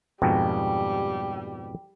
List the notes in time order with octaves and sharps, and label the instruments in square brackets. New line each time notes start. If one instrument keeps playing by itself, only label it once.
[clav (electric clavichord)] F2 G#2 B2 [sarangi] G3 [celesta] G5